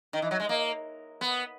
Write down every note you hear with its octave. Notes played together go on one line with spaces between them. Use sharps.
D#3
E3
F#3
G#3
A#3
B3